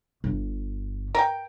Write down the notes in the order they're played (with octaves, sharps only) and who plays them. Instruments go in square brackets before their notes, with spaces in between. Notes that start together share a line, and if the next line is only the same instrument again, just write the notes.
[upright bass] G1
[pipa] A#4 G5